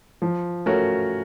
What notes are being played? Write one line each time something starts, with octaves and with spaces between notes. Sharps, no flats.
F3
A3 C#4 F#4 A#4